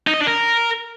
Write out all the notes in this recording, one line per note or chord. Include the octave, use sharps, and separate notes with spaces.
D#4
D#5
D4
A#4